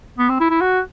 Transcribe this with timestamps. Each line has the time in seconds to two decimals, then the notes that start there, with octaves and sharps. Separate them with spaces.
0.18 B3
0.29 C4
0.40 E4
0.50 E4
0.61 F#4